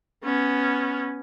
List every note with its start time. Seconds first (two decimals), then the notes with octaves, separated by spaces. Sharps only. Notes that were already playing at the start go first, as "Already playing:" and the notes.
0.24 B3 C#4